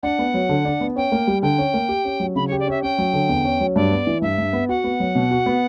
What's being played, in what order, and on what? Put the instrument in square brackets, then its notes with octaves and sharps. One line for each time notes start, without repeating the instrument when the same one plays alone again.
[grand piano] D4 [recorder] F#5
[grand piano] B3
F#3
D3
D4
B3
[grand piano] C#4 [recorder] G5
[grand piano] A#3
G3
[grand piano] D3 [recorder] G5
[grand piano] C#4
A#3
G4
C#4
F#3
[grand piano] C#3 [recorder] B5
[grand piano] G4 [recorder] C#5
[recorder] D5
[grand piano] C#4 [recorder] E5
[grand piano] C#4 [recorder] G5
[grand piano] F#3
D3
E2
C#4
F#3
[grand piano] G2 [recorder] D5
[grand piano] B3
E3
[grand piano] G2 [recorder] E5
[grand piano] G2
B3
[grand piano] F#4 [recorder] F#5
[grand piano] B3
F#3
B2
F#4
B3